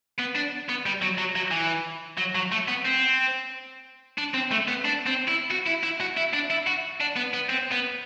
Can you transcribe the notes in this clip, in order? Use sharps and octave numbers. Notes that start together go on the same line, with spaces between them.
B3
D4
B3
G3
F#3
F#3
F#3
E3
F#3
F#3
A3
B3
C4
D4
C4
A3
B3
D4
C4
E4
F#4
E4
E4
F#4
E4
D4
E4
F#4
D4
B3
B3
C4
B3